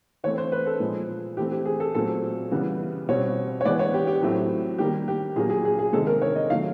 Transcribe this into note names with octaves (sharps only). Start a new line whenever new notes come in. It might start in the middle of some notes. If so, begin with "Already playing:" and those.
E3 A3 C4 C#5
C5
B4
A4
A#2 F3 G#3
E3 A3 C4 G4
G4
G#4
A4
A#2 F#3 A3 C4 A4
C#3 E3 G3 B3
B2 G3 C4 C#5
C#5
E3 G#3 B3 D5
C#5
G4
G4
A2 F#3 A3 C4
D#3 G3 A#3 G4
G4
A#2 F#3 A#3 G#4
G#4
G#4
G#4
C3 D#3 G#3 A4
A#4
C#5
D#5
D#3 F#3 A3 F5